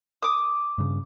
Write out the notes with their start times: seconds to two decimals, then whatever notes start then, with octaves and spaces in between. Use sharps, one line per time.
0.23 D6 D#6
0.78 G2 C#3